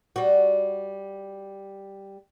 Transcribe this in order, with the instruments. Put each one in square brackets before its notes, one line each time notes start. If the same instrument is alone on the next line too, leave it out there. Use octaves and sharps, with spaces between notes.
[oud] G3 F#4